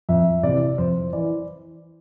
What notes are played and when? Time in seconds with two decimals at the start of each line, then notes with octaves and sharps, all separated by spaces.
0.09 F2 E5
0.43 C3 E3 D5
0.78 F2 C5
1.13 E3 D5